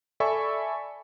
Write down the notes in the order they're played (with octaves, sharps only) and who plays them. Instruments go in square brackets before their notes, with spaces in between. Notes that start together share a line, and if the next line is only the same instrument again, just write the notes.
[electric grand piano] A4 D5 E5 G#5 B5 C#6